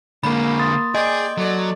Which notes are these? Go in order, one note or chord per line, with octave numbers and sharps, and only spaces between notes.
D3 G#3 A#3 B5
C6 D#6 A6
G#4 D5 D#5 G5
F#3 A4 D5